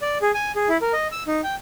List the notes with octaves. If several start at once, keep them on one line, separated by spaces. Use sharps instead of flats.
D5
G#4
G#5
G#4
E4
A#4
D#5
E6
D#4
G5